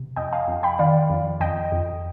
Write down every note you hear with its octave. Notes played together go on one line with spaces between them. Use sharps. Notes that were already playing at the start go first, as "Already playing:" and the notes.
Already playing: C3
F2 D#5 G5
F5 G#5
F2
G5 B5
D#3 D5 F5
F2
F2 D#5 G5
F2